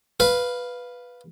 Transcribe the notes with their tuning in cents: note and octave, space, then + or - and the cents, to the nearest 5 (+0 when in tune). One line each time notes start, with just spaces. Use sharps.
B4 -5 F5 +0